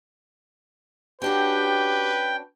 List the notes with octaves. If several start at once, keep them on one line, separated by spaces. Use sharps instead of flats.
C#4 D4 F#4 G4 B4 G5